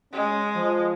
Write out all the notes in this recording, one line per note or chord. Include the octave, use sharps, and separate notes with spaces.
G#3 C#4
F3